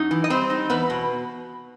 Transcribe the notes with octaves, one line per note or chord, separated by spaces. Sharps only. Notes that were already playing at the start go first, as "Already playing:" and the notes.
Already playing: F#2 D#4
E3
D#5
G3 C4 C5
D#4
E2 B3 B4
B2